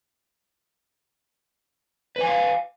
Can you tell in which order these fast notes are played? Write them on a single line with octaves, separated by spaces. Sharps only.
B4 G#5 F5